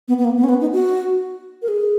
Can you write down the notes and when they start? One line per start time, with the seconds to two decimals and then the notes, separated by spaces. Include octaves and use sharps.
0.08 B3
0.18 B3
0.25 A#3
0.37 B3
0.44 C#4
0.49 B3
0.61 D#4
0.73 F#4
1.62 A#4
1.68 G#4